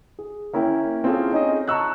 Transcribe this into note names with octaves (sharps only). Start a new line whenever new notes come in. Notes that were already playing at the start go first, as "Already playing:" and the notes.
G#4
A#3 C#4 E4 A#4 G5
C4 C#4 E4 F4 G#4 A4
C#4 D#4 G#4 D#5
A5 A#5 C#6 E6 F#6